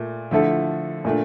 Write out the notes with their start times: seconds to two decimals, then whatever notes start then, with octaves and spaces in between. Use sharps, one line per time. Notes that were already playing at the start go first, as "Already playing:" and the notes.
Already playing: A#2 A3
0.31 D3 F3 A3 E4 A4
1.05 A#2 A3 D4